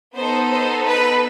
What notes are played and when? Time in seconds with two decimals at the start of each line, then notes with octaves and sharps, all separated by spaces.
0.15 B3 D#4 A4 C5
0.51 C5
0.87 B4